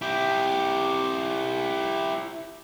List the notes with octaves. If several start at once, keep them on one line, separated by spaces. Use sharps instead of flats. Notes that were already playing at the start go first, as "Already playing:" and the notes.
E4 G4